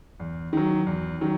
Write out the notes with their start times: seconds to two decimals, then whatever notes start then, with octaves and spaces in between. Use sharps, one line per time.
0.20 E2
0.53 D#3 F#3
0.86 E2
1.21 D#3 F#3